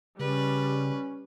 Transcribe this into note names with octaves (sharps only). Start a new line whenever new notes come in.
C#3 G3 C#4 B4